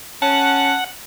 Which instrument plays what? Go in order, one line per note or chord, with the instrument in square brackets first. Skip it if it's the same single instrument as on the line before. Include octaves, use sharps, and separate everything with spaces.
[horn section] C#4 [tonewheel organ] F#5 [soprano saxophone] A5